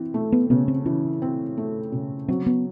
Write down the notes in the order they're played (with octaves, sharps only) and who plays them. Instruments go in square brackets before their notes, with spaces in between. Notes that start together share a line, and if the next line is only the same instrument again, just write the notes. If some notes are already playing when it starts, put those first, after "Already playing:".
Already playing: [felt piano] E3 C4
A3
[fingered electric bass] B3
[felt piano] C#3 [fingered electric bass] B3
[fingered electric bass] C4
[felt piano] E3 [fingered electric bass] C#4
[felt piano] C4
A3
C#3
[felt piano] F#3 [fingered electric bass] C4
[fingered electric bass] B3